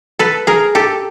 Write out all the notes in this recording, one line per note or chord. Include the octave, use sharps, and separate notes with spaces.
A4 B4
G#4 A#4
G4 A4